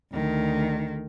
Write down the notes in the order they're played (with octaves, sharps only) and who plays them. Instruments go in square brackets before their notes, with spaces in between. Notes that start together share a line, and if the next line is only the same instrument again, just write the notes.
[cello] D2 D#3